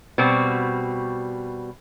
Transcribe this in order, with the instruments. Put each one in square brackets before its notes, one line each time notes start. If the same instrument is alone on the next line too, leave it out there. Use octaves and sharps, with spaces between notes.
[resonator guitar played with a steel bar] B2 G3 C4 F#4